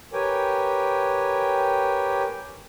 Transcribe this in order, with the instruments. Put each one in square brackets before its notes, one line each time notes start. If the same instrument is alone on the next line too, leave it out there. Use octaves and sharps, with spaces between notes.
[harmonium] G4 A#4 B4 C#5 G5 G#5